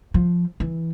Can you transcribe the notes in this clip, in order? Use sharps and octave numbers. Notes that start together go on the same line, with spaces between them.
F3
E3